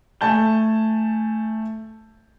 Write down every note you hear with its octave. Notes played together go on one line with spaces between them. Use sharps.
A3 G#5 A5 G6 G7